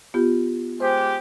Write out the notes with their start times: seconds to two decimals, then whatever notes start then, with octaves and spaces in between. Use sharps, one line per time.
0.14 B3 F4 G4
0.80 G#3 G4 C5